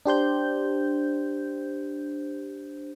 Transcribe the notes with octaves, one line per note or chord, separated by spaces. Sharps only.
D4 G4 C5 G6